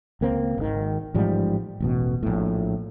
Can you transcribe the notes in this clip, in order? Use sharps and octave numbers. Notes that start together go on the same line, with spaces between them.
C#2 A#3 C4
G#1 D#3
A1 G#2 F3 G3
E1 A1 B2
A#1 A2